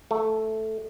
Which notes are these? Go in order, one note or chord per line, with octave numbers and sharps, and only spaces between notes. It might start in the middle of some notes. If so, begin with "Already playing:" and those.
A3